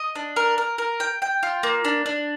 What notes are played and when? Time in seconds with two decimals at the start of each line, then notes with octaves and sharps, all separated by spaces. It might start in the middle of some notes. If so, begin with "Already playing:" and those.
Already playing: D#5
0.15 D4
0.36 A#4
0.58 A#4
0.78 A#4
1.00 G5
1.22 G5
1.43 F4
1.63 A#3
1.85 D4
2.06 D4